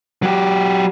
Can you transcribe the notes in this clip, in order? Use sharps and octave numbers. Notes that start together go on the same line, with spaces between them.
F#3 G4